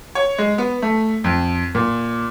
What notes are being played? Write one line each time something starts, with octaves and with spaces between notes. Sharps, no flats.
C#5
G#3
B3
A3
F2
A#2